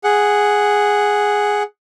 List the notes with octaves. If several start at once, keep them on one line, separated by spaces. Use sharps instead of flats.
G#4 F#5